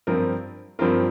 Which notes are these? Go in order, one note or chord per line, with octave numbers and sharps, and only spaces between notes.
G2 F3 C4 F4 A#4
G2 F3 C4 F4 A#4